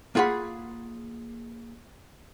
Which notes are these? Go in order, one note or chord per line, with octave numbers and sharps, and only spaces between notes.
A#3 F4 G#4 F#5 B5